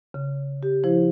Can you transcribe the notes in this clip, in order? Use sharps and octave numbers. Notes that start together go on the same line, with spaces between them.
C#3
G4
F3 E4 C5